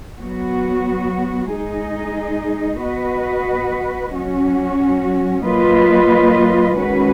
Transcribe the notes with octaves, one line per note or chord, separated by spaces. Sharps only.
F#3 B3 F#4
G#3 D#4 G#4 D#5
B3 F#4 B4 D#5
F#3 C#4 F#4
F#3 A#3 F4 B4 D#5
D#3 G#3 C#4 F#4 B4